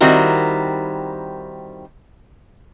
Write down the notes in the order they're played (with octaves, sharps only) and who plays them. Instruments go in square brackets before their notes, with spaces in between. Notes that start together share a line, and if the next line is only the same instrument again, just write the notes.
[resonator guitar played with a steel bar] D#3 G3 C4 E4 F#4 A#4